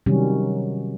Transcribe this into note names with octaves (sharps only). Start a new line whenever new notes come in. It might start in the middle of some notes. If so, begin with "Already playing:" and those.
C3 D#3 F#3 G3 C#4